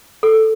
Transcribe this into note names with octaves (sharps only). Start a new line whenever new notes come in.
A4